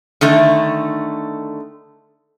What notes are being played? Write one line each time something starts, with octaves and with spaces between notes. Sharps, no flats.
D3 D#3 A3